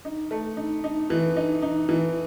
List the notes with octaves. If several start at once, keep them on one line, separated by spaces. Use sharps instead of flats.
D#4
A3
D#4
D#4
E3
D#4
D#4
E3